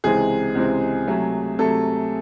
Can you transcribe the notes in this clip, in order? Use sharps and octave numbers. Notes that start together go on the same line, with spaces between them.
C#2 C3 E3 G#3 C4 G#4
C#2 C3 E3 G#3 C4
C3 F#3 A3
C3 F#3 A3 A4